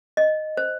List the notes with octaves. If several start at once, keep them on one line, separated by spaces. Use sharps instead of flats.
D#5
C5